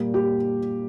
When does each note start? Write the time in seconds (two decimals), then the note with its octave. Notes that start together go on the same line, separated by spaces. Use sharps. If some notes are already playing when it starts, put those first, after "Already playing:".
Already playing: A#2 G3 A#3 G4
0.14 G4